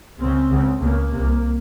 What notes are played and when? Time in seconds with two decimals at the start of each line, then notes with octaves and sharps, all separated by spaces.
0.19 C#2 C#3 C4
0.50 C#2 C#3
0.80 C#2 C#3 A#3
1.11 C2 C3